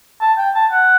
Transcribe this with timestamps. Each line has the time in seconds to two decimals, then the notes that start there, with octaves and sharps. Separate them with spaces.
0.21 A5
0.38 G5
0.55 A5
0.72 F#5